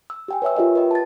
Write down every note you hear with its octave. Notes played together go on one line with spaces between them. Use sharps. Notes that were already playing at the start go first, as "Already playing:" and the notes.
E6
G4 G5 G#5
B4 C#5 E5 E6
F4 G4 A#4 D#5 E5
B4 D#5 G5
A5 A6